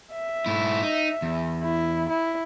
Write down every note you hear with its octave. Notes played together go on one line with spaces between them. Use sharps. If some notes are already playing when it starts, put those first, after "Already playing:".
E5
G#2 E4
D#4
E2
E4
E4